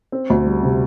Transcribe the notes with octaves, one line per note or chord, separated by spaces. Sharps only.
C4
D2
G3
C3